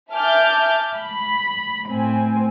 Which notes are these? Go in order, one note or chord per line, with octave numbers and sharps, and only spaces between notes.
E5 G#5 A5 D6 F6 G6
B5
A2 C4 G#5